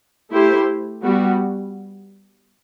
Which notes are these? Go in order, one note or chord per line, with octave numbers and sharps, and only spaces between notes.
A3 E4 G4 C5
G3 B3 F#4